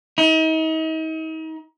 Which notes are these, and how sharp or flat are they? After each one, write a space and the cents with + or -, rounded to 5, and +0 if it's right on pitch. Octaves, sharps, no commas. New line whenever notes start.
D#4 +40